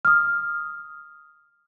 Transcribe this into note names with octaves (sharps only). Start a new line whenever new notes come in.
D#6 F6